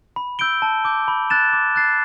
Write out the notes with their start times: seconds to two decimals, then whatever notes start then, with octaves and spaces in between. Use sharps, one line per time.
0.16 B5
0.39 E6 G6 D7 G7
0.62 A5
0.85 D6 G6
1.08 B5
1.30 F#6 A6 E7
1.53 D6
1.76 F#6 A6 C7